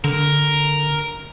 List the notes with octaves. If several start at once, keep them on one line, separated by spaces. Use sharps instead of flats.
D3 A#4